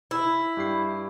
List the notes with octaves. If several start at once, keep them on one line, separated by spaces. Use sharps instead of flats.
E4
G2 G4 C7